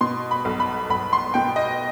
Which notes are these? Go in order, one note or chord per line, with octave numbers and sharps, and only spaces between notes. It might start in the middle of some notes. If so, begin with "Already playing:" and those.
B2 C6
B5
B1
B5
B1 B5
C6
B2 G5
D#5